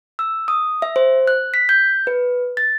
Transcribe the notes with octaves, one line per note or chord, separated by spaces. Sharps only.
E6
D#6
E5
C5
F#6
B6
G6
B4
A6